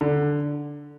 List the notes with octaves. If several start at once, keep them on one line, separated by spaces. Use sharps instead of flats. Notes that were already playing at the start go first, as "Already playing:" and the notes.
D3